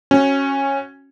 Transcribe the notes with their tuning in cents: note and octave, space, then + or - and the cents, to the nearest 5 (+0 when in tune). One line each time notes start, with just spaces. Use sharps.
C#4 -15 F#4 +0